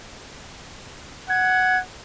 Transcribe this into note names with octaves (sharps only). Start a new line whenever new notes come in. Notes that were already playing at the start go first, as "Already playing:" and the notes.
F#5 G#6